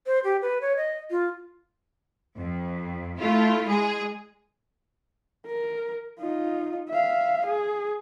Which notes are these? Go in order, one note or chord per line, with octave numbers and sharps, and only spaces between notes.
C5
G4
B4
C#5
D#5
F4
F2
A3 E4 F4
G#3 G#4
A#4
D#4 F4
E5 F5
G#4